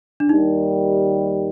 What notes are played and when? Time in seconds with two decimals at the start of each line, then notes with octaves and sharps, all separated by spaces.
0.20 D4
0.29 D#2 D#3 G3 D#4